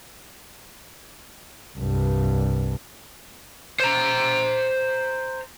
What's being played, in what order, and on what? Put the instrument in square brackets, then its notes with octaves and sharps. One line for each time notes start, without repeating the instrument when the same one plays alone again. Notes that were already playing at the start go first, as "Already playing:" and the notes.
[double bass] C2 G2
[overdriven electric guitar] C5 A#5